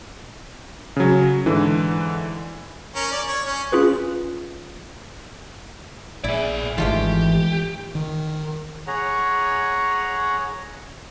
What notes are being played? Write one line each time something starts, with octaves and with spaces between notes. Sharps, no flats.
C#3 F#3
G#2 D3 E3
C#4 A#4
D5
C#5
C#4
C#4 F4 G#4 B4
A#1 E4 G#4 D5
G#1 D#3 E3 G#3 A3 F4 G4
D#3
G#4 C#5 F#5 A#5